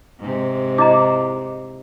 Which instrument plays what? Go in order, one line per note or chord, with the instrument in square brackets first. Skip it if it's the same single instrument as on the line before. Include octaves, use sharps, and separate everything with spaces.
[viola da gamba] G#2 C3
[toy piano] E4 D#5 A#5 [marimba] D6